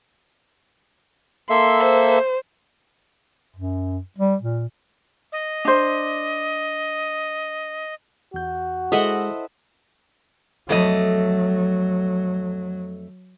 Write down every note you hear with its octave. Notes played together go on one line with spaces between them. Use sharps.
A#3 A4 E5 C6
C5
F#2
G3
A#2
D#5
D4 C5
E2 F#4 G6
G#3 E4 G#4 A4 C5 D#5 E5 F#5
F2 F#3 A3 D#5